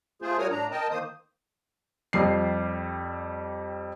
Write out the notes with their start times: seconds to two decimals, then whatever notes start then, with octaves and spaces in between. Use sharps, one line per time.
0.22 A3 F4 G#4 C5
0.38 G3 F#4 A#4 C#5 D#6 F6
0.51 A2 D4 A#5
0.71 A#4 D#5 G5 A5
0.91 D#3 A#3 C5 D#6
2.13 F2 G3 C7